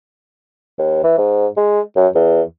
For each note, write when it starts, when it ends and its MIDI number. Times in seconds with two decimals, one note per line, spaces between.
0.79 1.03 39
1.03 1.16 52
1.18 1.47 44
1.57 1.81 56
1.96 2.08 42
2.15 2.42 40